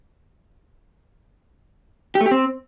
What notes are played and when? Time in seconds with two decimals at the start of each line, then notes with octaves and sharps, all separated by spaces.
2.15 G4
2.21 A3
2.26 G4
2.31 C4